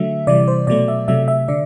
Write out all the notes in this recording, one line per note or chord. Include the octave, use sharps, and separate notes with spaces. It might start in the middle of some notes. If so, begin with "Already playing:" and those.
Already playing: D3 F#3 A3 E5
C3 E3 G3 D5
C5
B2 F#3 A3 D5
E5
C3 F#3 A3 E5
E5
D3 D5